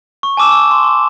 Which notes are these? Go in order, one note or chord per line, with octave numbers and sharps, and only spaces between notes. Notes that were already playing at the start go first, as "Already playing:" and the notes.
C#6
G#5 A5 D6 E6 E7
E6
C6
C6